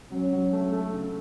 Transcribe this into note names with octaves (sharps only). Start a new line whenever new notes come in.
F#3 C#4
F#3
A3
A3
C#3